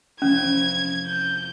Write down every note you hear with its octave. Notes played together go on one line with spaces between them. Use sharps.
F1 F3 C#4 E4 G#6
G6